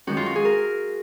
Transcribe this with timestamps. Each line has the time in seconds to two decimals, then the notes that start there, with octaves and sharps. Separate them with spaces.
0.07 F#2 D#3 G#3 F#4
0.17 F4
0.26 F#4
0.35 G#4
0.45 A#4